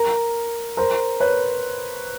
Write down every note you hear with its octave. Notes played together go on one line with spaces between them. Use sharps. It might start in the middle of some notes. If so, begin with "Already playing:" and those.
Already playing: A#4
A#4 C5
B4 C#5